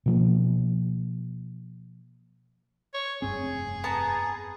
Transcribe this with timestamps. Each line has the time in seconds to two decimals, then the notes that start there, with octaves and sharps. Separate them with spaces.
0.06 B2 F3 A#3
2.94 C#5
3.22 F1 G2 C4 G#4
3.84 B3 A5 A#5